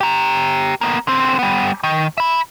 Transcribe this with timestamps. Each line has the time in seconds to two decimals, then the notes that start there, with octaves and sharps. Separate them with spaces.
0.01 G4 A#5
0.81 A#3 B3
1.07 D3 C4
1.39 G3 B3
1.83 D#3
2.18 E5 B5